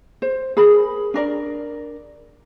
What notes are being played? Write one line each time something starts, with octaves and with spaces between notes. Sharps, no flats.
C5
G#4 A#4 B5
D4 A#4 D5